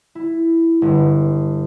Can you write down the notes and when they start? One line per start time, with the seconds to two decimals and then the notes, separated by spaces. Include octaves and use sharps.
0.15 E4
0.82 G1